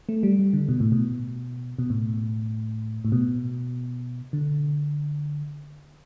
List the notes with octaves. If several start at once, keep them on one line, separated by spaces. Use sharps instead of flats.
A3
G3
G3
D3
B2
A2
B2
B2
A2
A2
B2
D3